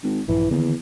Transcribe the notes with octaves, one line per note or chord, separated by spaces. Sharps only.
G#1
A#1 G2 E3 F3
E2 D3 D#3 A#3